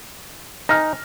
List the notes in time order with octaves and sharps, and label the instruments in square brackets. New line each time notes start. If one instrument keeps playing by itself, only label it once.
[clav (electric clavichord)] D#4 [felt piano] G#5 F6 A#6